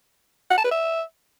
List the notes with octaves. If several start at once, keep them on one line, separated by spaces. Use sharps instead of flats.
F#5
A5
B4
E5